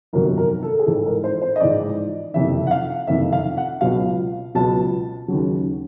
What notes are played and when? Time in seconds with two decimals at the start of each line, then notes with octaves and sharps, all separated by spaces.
0.13 G1 F2 C3 D#3 F#3 A#4
0.37 A#4
0.63 A4
0.79 G#4
0.86 A1 G#2 F3 A4
1.06 A#4
1.24 C5
1.41 C5
1.56 D#5
1.60 A1 G#2 F3 D5
2.34 F#1 F2 C3 D#3 E5
2.67 F#5
2.71 F5
3.07 F#1 F2 C3 D#3 E5
3.33 F5
3.57 F#5
3.81 C#2 B2 F#3 F5
4.55 C#2 B2 F#3 A5
5.28 D#2 C#3 F#3